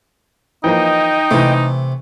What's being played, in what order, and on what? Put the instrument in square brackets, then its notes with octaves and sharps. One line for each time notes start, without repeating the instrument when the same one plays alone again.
[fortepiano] E3 F3 A#3 [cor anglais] D#4 [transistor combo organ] D#5 G5
[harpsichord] C3 [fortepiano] E3 A3